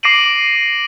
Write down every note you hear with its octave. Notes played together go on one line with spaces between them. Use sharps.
D6 A#6 C7 D7 D#7 F#7